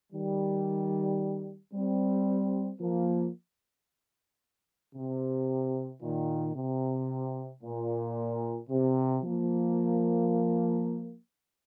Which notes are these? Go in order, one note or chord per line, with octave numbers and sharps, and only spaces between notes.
D#3 G3
G3 C4
F3 A#3
C3
A#2 D#3
C3
A#2
C3
F3 A#3